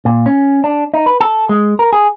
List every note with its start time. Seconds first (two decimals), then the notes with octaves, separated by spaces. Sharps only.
0.05 A#2
0.26 C#4
0.64 D4
0.94 D#4
1.06 B4
1.21 A4
1.49 G#3
1.79 A#4
1.93 G#4